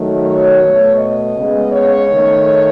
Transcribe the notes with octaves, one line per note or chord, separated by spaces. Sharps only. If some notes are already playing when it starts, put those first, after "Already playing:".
Already playing: D#3 F#3 A3
C#5
B2 A3
D#5
C#3 G#3 B3
C#5
D#3 A3